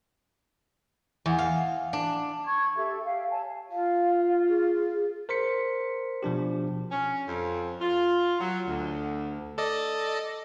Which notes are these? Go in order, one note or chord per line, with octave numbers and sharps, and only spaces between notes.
E2
F5
D4
C#6 G#6
G4 A4 E5
E5 F5 G5
C#5 G#5 A5
F4 F5
G#4
A#4 C5 C6 B6 C#7
B2 F3 D4 G4
C#4
F2
F4
F#3
D2
A4 D5 D#5